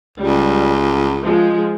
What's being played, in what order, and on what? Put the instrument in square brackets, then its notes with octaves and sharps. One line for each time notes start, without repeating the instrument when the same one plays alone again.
[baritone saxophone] C#2 [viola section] G3
[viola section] F3 G#3